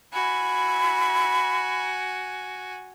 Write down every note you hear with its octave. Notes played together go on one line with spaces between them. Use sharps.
F#4 G#5 B5